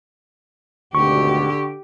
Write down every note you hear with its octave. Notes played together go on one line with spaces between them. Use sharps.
G#1 D2 B2 D3 G4 C#6